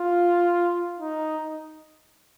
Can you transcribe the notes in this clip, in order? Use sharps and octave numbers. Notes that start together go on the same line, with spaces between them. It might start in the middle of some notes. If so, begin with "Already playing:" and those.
Already playing: F4
D#4